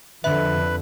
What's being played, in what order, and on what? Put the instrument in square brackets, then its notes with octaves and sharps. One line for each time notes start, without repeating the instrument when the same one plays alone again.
[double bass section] F2 D3 [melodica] B4 [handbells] E5